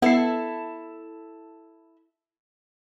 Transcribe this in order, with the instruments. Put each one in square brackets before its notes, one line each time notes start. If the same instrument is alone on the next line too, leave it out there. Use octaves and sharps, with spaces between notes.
[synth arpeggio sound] B3 C7 [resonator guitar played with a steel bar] E4 A4